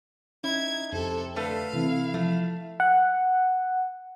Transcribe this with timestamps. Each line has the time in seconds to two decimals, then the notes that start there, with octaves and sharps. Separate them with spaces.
0.44 C#4 D#4 E4 G#6
0.93 F2 C3 A4
1.36 D3 A3 A4 B4 F5
1.74 C3 E3 C4 E4
2.14 F3 A3
2.80 F#5